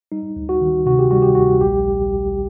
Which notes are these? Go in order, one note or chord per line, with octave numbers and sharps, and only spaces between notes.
G3 D#4
D2
F#4
D#3
C3 F#4
G4
G3 F#4
G4
D2 F#4
A#1 G4